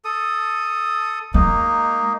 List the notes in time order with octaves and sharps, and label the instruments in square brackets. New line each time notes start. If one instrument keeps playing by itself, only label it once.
[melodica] A4 D#6
[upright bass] G#3 [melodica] A#3 D#4